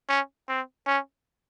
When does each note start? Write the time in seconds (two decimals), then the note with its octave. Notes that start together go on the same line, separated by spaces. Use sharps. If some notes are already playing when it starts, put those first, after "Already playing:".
0.09 C#4
0.49 C4
0.87 C#4